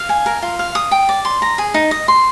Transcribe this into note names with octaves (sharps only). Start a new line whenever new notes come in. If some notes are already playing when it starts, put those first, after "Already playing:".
Already playing: F5
G#5
A#4
F4
F5
D#6
G5
D5
C6
A#5
G#4
D#4
D#5
C6